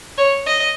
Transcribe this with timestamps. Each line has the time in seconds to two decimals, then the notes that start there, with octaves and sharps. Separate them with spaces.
0.18 C#5
0.46 D#5